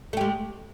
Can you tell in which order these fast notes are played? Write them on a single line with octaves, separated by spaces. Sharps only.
A3 G4 G#3